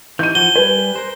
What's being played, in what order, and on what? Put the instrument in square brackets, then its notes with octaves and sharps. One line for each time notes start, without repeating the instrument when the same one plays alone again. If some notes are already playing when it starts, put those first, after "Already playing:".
[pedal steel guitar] E3 D#4 [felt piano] G6 D#7
[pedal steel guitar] F3 F#4 [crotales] G7
[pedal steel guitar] G3 G#5 [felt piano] B4
[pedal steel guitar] A#4 C5